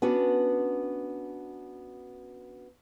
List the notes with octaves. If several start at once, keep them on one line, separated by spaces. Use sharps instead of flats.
B3 C#4 D4 F#4